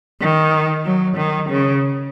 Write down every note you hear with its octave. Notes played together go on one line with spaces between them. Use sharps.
D#3
F#3
D#3
C#3